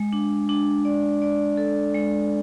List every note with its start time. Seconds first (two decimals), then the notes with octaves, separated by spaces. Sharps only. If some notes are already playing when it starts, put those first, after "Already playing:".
Already playing: G#3
0.13 D4
0.49 D4
0.85 D5
1.22 D5
1.57 A4
1.95 G#3